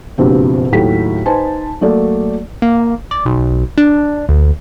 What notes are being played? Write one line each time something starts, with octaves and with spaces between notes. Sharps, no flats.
F#1 G2 B2 F3 C4 G4
D#2 A2 F#3 A4 G5 B6
D#4 B4 C5 D#5 G#5 A5
F#3 A3 A#3 A4 D5
A#3
D5
B1
D4
D2